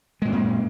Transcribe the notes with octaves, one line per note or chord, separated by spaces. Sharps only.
F#2 A#2 G#3 C4